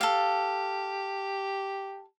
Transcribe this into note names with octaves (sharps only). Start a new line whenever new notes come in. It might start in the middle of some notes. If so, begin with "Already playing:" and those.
G4 A4 F5